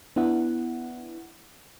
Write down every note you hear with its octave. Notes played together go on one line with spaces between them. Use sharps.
B3 D4 E4 F#5